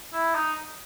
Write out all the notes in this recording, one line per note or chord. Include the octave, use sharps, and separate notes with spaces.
E4
D#4